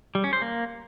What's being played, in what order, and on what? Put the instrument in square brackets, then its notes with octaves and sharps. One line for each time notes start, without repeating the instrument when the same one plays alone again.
[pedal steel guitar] G3
C#4
C5
A#3